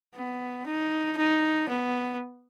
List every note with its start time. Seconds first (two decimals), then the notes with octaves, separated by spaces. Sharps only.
0.15 B3
0.66 D#4
1.17 D#4
1.69 B3